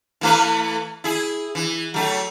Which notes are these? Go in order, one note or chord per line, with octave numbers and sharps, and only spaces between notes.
E3 A3 B4
E4 G#4
E3
F#3 A3